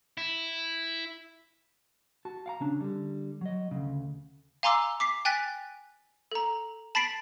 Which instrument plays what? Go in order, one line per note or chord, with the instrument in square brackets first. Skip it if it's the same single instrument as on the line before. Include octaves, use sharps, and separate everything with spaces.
[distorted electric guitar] E4
[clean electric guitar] F#4 A5
F5 F#5 A#5
C#3 C#4 D4
D3 G3
F#3 D#5
D2 C#3
[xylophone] F5 G#5 A#5 C6 D6 E6
D6 B6 C7
G5 G#5 F#6 A6 B6
A4 A#5
A5 B5 A6 B6 C7 D7